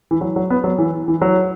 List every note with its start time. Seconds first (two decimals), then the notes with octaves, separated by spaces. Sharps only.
0.11 E3
0.21 F#3
0.36 F#3
0.50 B3
0.64 F#3
0.78 E3
1.08 E3
1.22 F#3